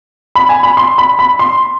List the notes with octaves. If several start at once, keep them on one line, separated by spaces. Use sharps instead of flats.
B5
G#5
B5
C6
B5
B5
C6